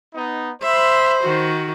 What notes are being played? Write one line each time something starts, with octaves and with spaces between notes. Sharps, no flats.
B3 D#4
C5 E5 B5
D#3 F#4